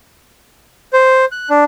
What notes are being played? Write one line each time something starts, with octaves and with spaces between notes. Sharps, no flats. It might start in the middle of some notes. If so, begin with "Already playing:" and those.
C5
F#6
D4